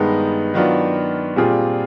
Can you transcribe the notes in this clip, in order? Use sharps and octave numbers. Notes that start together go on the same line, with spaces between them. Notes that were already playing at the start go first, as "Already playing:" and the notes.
Already playing: G2 D#3 G#3 B3 D#4
D#3 F#3 B3 D4 F4
A#2 G3 C4 F4 G#4